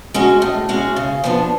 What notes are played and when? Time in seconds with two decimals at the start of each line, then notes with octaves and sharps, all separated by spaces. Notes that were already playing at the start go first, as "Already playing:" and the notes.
0.14 G#3 C#4 F#4
0.42 A2
0.69 G#3 C#4 F#4
0.96 C#3
1.24 F3 B3 D4